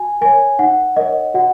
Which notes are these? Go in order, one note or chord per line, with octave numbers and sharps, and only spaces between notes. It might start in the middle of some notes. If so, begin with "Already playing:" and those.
Already playing: F#4 G#5
A#4 C#5 G#5
D#4 F#5
A#4 C#5 D#5
F#4 F#5